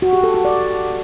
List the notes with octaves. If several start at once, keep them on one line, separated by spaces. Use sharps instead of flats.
F#4
G4
A4
F#4
D5